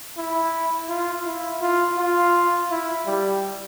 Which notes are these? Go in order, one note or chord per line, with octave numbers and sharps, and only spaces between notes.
E4
F4
E4
F4
F4
E4
G3